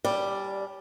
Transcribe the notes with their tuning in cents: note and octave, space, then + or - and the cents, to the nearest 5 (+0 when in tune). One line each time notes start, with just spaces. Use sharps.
G3 +0 C#4 +40 D5 +5